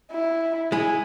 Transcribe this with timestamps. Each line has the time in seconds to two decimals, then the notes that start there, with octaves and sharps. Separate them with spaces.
0.11 E4
0.72 G#3 E4 G#5